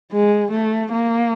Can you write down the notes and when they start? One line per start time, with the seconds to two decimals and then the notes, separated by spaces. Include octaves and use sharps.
0.12 G#3
0.51 A3
0.92 A#3